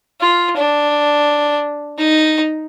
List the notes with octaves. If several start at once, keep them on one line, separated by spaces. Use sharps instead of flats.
F4
D4
D#4